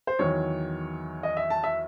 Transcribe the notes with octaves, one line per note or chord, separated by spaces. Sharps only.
C5
E2 D#3 F#3 C#5
D#5
E5
A5
E5